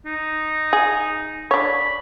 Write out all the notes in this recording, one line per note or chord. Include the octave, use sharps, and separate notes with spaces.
D#4
G#4
D4 C#5 B5